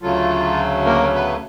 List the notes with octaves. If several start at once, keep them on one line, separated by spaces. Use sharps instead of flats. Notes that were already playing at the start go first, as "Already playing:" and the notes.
D2 C#3 F#3 A3 F4
A#3 A#4
B3 B4